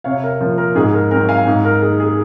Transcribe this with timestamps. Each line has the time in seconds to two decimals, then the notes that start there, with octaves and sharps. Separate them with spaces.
0.04 C3 C#5 F5
0.23 A#4
0.40 F3 A#3
0.58 A#4
0.75 G#2 G#4
0.94 A#4
1.11 F#3 C4 A#4
1.29 F5 G#5
1.46 G#2
1.65 A#4
1.81 D#3 G#4
1.87 A#3
2.00 G#4